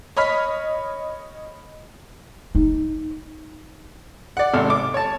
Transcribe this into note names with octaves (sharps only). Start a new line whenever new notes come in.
C#5 D#5 B5 F6 B6
D#4
D5 F#5
G#1 C3 A4 F6
D6
C#5 A5